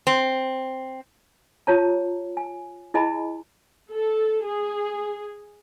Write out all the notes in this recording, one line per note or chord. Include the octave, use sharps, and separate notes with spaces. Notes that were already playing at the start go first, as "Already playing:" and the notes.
C4
F4 G4 C#5 A5 A#5
G#5
E4 G#4 D#5 G#5 A#5 B5
A4
G#4